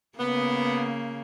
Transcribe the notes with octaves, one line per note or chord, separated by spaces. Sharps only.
C#3 A#3 B3